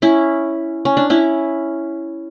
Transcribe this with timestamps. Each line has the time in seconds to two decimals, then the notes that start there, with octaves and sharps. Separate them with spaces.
0.02 C#4 E4
0.85 C#4
0.97 D4
1.10 C#4 E4